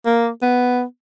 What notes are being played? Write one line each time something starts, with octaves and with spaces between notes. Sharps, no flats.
A#3
B3